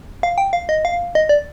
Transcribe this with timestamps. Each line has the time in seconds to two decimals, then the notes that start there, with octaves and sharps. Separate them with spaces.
0.23 F5
0.38 G5
0.53 F5
0.69 D#5
0.85 F5
1.15 D#5
1.29 D5